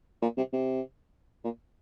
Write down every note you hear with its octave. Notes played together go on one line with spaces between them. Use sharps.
A#2
C3
C3
A#2